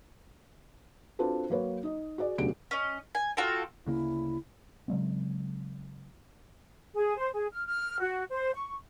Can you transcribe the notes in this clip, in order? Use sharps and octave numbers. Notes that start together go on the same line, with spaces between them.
C4 D4 F4 F#4 A4 B4
F#3 A#3 B4 C#5
D#4 D#5
F#4 G#4 D5
E1 D2 C#3 F#3 G4 D7
C#4 D#5
G#5
F4 F#4 A4 G5
D2 C#3 A#3 E4
C#3 F#3 G#3 C4
G#4
C5
G#4
F6
F6
F#4
C5
C#6